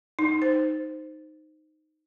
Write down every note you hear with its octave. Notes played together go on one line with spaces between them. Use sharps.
D#4
C5